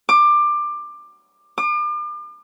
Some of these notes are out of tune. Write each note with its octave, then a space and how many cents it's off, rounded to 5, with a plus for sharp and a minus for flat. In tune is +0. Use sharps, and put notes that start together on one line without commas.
D6 +20
D6 +40